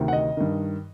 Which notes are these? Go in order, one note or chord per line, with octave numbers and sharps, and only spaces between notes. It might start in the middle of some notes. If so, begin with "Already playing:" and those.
Already playing: D2 C3 D#3
F#5
D#5
G2 D#3